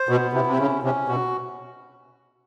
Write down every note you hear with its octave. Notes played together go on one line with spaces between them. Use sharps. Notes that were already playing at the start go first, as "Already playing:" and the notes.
Already playing: C5
B2 B3
C3 E4
C3
C#3 C#4
C3 C#4
B2 F#4